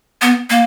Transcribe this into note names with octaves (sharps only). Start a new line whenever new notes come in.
B3
A#3